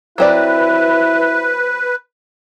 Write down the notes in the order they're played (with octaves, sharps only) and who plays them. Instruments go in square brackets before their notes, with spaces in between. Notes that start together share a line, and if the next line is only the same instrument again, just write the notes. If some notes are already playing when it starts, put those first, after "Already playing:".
[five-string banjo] F#3 C4 D5 [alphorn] E4 [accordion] B4